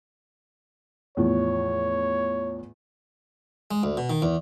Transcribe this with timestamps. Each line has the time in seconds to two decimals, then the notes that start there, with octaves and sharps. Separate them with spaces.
1.17 E2 A2 F3 C#5
3.71 G#3
3.83 D2
3.97 B2
4.10 D#3
4.22 E2